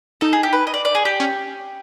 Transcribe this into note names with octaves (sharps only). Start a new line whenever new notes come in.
D#4 A4
G#4
G4
B4
D#5
D5
D5
G#4
G4
C#4